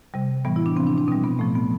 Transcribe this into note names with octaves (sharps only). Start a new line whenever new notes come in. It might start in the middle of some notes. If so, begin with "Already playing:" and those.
C3 G3
A2 E3 G3 B3
E4
D4
C3 F3 C4
D4
D4
B2 G3 C4
B3
A2 F3 A3
B3